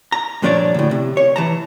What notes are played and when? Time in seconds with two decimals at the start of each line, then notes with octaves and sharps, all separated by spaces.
0.12 A#5
0.42 G2 A#2 F3 D4 C#5 D5
0.74 D2 A2
0.91 C3
1.17 C#5
1.36 E3 A5 A#5